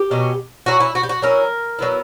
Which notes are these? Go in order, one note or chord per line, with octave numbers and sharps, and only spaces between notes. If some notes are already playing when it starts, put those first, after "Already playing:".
Already playing: G4
B2 F#3 C#4
F#3 C#4 E4 F#4
E4
F#4
G4
F#4
F#3 C#4 E4 A#4
F#3 B3 E4